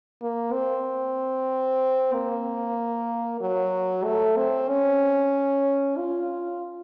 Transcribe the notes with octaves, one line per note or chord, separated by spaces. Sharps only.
A#3
C4
A#3
F#3
A3
C4
C#4
F4